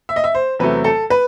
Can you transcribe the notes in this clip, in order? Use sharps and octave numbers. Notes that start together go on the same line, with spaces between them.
E5
D#5
E5
C5
E2 C3 F#3 A3 B4
A4
B4